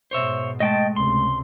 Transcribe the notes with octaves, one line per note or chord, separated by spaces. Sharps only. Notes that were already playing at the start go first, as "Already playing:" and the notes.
G#2 B2 C5 C#5 E5
G#3 A3 D#5 G5 A5
C#2 C3 C6